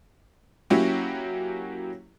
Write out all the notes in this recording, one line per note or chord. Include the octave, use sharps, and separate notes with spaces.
F#3 A#3 C#4 E4 F#4 G4